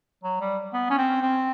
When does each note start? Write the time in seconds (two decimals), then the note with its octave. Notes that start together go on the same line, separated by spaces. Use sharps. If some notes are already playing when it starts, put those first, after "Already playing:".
0.23 F#3
0.41 G3
0.73 B3
0.90 C#4
0.98 C4
1.22 C4